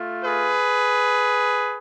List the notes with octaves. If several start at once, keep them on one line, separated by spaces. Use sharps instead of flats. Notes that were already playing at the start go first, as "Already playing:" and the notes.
Already playing: A3 F4
G#4 B4